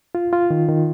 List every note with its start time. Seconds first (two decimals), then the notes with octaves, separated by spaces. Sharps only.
0.15 F4
0.33 F4
0.51 D#3
0.69 D#3